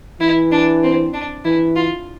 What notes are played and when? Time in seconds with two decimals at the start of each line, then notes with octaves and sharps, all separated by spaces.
0.20 E3 E4
0.51 D4
0.83 C4
1.14 D4
1.45 E3 E4
1.76 F4